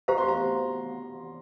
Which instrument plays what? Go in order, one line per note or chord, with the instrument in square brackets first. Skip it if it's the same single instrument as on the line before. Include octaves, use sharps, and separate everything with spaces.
[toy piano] G4 C5 F5 [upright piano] A#5
[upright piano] C6
A#5